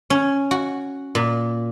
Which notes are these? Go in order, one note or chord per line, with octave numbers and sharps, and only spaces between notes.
C#4
F#4
A#2